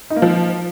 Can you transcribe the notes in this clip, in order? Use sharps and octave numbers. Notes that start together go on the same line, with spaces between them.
D#4
A#3
F3